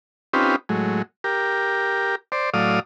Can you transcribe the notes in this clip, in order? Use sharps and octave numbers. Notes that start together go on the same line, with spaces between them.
C4 C#4 D#4 F4 G4 B4
A2 F#3 G#3
G4 A#4
C5 D5
A2 F#3 D5 F5 D#6